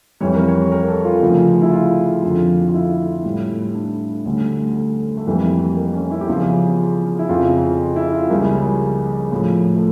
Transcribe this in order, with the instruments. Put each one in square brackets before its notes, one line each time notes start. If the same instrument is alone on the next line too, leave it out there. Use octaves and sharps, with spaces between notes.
[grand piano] F2 E3 G3 C#5
A#4
C#5
A#4
A4
F4
D2 C#3 F3
E4
F4
F2 D3 F3
F4
E4
A2 G3
D4
D2 D3 G3 C#4
A3
A3
F2 E3 G3 A#3
A#3
C#4
E4
G4
E2 C#3 F3 F4
E4
F2 C#3 F3 F4
E4
F4
C#2 C#3 G3 A#3
A2 F3
A3